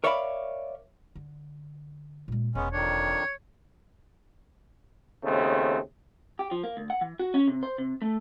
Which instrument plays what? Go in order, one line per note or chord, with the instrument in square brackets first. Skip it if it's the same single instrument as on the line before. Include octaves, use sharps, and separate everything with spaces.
[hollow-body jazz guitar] A#4 C#5 D5 E5 F5 B5
[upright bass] D3
A#2 G#3
[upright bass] E1 [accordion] G#3 B3 C#4
[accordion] F2 D#3 D4 [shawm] C#5
[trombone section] D#2 C#3 A3 C4
[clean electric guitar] G4
F3
A#3
D2
F#5
E3
F#4
C#4
C3
C5
C3
A3